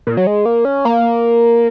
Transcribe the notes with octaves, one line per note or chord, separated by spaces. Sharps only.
A#2
F#3
G#3
A#3
C#4
A#3